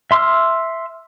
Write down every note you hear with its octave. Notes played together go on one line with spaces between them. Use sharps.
E5 C6 D6 E6 F6